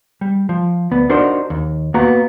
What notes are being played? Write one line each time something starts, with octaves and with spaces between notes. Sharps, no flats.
G3
F3
D2 B3
D4 D#4 F#4 A#4 C5
D#2
A#3 B3 F#4 A#5